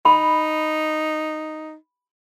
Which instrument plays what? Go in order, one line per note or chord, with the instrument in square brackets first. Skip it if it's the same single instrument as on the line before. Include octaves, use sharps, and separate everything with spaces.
[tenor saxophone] D#4 [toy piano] B5